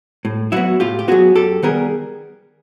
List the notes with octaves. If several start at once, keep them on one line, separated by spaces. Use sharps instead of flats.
A2
F#3 B3 E4 F#4
A2 F4 G4
G4
F#3 B3 F#4 G#4
F#2 G4 A4
D#3 G3 B3 G#4 A#4